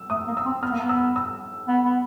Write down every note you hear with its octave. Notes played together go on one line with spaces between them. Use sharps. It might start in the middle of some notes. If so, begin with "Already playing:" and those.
Already playing: E6
A3 D#6
A#3
E6
C4
B3 F6
A#3
B3
E6
E6
B3
B3